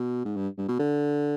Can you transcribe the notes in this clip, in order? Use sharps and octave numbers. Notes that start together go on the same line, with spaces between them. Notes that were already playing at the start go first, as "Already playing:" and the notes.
Already playing: B2
G#2
G2
G2
B2
D3